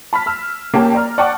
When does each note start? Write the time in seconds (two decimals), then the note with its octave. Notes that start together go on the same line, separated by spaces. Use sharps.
0.13 A5 B5 F6 B6
0.26 E6 F6
0.74 A#3 C#4 G4 A#4 G5 A5
0.95 D5 A#5 F6
1.18 D5 F#5 G5 A5 C#6 D6